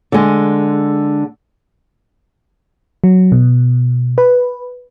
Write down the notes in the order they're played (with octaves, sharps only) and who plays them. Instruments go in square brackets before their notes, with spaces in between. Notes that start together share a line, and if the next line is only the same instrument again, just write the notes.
[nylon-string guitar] D3 G#3
[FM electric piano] F#3
B2
B4